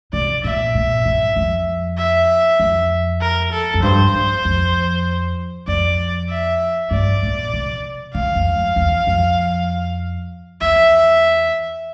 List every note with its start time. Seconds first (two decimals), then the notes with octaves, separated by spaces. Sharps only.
0.13 C3 D5
0.44 A#2 E5
0.75 A#2
1.05 G2
1.36 F2
1.98 E5
2.60 F2
3.21 A#4
3.52 A4
3.74 F2
3.83 G2 C5
4.14 G2
4.45 F2
5.68 F2 D5
6.30 E5
6.91 G2 D5
7.23 A#2
7.54 C3
8.15 D3 F5
8.35 F2
8.56 G2
8.76 E2
9.07 F2
10.61 E2 E5